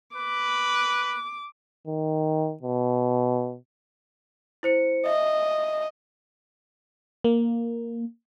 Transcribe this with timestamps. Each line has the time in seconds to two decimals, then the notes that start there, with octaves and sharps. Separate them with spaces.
0.16 B4 D6
1.87 D#3
2.63 B2
4.63 E4 C5 C#7
5.06 D#5 E5
7.24 A#3